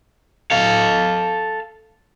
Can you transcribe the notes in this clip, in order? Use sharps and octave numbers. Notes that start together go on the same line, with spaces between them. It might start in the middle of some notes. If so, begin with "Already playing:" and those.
A4 F5